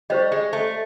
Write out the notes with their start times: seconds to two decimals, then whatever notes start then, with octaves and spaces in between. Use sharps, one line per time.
0.10 G3 G4 C5 D#5
0.32 G#3
0.53 A3